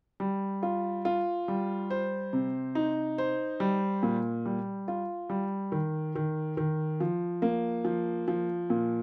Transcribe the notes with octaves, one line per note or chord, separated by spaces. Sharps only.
G3
F4
F4
G3
C5
C3
D#4
C5
G3
A#2
G3
F4
G3
D#3
D#3
D#3
F3
A#3
F3
F3
A#2